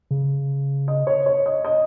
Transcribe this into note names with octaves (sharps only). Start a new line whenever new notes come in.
C#3
D#5
C#5
C#5
D#5
D#5